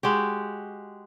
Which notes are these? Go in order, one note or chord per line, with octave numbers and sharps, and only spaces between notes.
G#3 F#4 G4